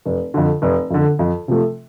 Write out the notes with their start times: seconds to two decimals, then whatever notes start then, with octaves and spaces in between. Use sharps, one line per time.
0.05 F1
0.34 F2 D3
0.62 F1
0.90 F2 D3
1.19 F2
1.48 C3 F3 A3